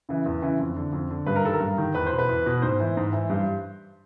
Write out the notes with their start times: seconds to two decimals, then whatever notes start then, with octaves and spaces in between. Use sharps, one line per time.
0.09 C#3 E3
0.26 E2
0.42 C#3 E3
0.59 F2
0.76 D3
0.93 F2
1.11 D3
1.26 G2 B4
1.36 A#4
1.44 D#3 A4
1.53 A#4
1.60 G2
1.78 D#3
1.95 E2 B4
2.06 C5
2.12 B2
2.18 B4
2.29 E2
2.46 B2
2.62 G#2 C5
2.80 E3
2.97 G#2
3.13 E3
3.30 G2